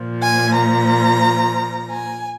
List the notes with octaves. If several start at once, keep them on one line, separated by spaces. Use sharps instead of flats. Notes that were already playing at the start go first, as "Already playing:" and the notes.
Already playing: A#2 F3
G#5
A#5
G#5